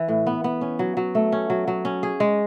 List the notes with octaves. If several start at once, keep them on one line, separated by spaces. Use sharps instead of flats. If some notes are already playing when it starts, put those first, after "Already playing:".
Already playing: E3
A2
B3
B3
C#4
F#3
F#3
A3
C#4
F#3
F#3
C#4
G#4
G#3